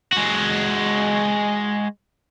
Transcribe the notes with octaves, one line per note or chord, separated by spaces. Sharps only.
G#3 F#4